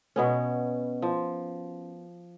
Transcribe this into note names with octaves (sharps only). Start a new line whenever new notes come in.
B2 B3 C#4
F3